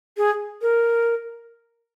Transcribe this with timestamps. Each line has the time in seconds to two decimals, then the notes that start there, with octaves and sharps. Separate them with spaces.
0.17 G#4
0.62 A#4